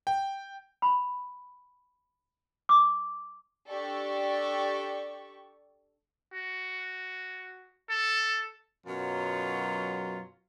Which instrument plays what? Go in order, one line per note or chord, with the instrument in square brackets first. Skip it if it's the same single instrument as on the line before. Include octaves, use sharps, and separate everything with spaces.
[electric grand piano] G5
[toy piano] B5
D6
[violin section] D4 G4 A4 D5 C#6
[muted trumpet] F#4
A4
[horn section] F#2 B2 F#3 F4